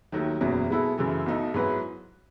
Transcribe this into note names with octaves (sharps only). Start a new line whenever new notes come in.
D#2 D#3 F#3 A3
F#1 E2 B2 F#3 C#4
B2 G#3 B3 E4 A4
F#2 C#3 E3 A3
B1 B2 A3 D#4 A4
G#2 F#3 B3 E4 B4